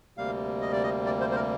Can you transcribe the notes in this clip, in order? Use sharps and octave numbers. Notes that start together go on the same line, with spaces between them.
D2 C3 G3 A#3 F5
D#5
D5
D#5
D5
C5
C5
A#4